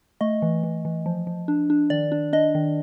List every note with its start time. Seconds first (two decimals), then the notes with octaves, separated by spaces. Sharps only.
0.21 A3 D#5
0.42 E3
0.63 E3
0.85 E3
1.06 F3
1.27 F3
1.48 D4
1.70 D4
1.90 D#3 D5
2.12 D4
2.33 D4 D#5
2.55 D#3